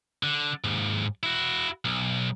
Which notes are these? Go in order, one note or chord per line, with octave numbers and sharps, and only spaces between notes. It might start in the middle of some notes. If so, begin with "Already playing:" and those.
D3
D#2 G#2
E4 F#4
B1